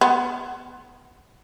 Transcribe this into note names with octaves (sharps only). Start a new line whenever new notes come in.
B3